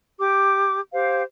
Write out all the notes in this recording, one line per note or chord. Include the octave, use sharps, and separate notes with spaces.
G4 D6
G4 C5 F5